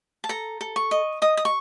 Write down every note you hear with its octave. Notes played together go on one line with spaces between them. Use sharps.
A5
A4 A#5
A4
C#6
D#5
D#5 D#6
D#6
C#6